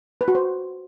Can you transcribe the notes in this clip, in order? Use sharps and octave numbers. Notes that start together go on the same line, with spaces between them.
B4
F#4
C5